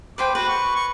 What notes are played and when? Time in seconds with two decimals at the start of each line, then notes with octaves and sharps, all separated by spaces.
0.18 B4 C5 G5 D6
0.35 F#4 B4
0.48 C#6
0.76 C#6